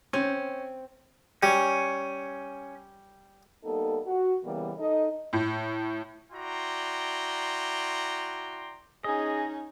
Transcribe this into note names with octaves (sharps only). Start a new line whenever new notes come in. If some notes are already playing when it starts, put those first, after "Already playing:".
C4 C#4
G3 C#4
G3 A#3 B3 D#4 A4
F#4
C#3 E3 G3 A#3 B3
D#4 A4 D#5
A2
E4 F#4 D5 G5 A#5 C6
C#4 D#4 G#4 D#5